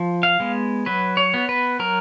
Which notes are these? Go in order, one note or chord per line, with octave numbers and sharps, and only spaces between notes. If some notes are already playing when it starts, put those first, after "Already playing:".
Already playing: F3
F5
G#3 B3
F#3 B4
C#5
B3
B4
F#3 A#4